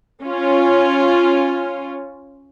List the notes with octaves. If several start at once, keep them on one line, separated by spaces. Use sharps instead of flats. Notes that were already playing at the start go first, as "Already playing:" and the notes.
C#4 F4